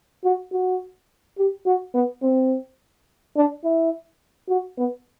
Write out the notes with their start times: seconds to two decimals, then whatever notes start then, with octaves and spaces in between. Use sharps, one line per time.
0.24 F#4
0.53 F#4
1.38 G4
1.66 F#4
1.94 B3
2.23 C4
3.37 D4
3.64 E4
4.49 F#4
4.78 B3